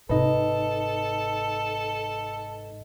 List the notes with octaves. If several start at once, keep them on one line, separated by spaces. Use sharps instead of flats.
G1 G#2 C3 D#4 A4 B4 D#5